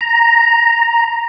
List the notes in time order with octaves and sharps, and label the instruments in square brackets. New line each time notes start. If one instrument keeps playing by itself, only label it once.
[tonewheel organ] A#5